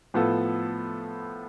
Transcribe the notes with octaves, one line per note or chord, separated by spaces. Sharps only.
A2 F3 B3 F4 A4